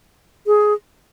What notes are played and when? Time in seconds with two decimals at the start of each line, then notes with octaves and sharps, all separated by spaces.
0.47 G#4